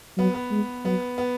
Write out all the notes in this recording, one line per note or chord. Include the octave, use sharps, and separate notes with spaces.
F#3 B3
B3
G#3
F#3 B3
B3